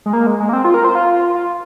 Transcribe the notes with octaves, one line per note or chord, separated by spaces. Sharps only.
G#3
A#3
G#3
G#3
A#3
C4
F4
A#4
C5
F4
F4